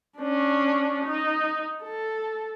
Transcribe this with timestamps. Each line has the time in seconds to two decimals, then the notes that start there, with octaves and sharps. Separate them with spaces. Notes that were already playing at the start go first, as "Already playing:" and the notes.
0.18 C#4 D4
1.04 D#4
1.83 A4